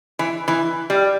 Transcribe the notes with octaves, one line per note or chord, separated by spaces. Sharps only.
E3
E3
G3